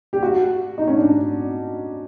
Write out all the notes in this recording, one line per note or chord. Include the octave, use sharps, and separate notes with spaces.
G4
F#4
D#4
C#4
D4